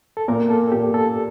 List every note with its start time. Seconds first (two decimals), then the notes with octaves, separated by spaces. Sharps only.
0.17 A4
0.28 A#2 A#4
0.50 A4
0.72 A#2 G4
0.94 A4